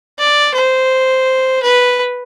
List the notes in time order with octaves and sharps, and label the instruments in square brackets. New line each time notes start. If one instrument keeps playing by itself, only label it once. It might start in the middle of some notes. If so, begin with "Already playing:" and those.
[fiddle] D5
C5
B4